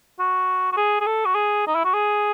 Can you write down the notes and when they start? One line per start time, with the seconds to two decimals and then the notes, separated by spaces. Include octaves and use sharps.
0.19 F#4
0.72 F#4
0.77 G#4
1.00 G#4
1.06 A4
1.26 F#4
1.35 G#4
1.67 D#4
1.75 E4
1.84 F#4
1.94 G#4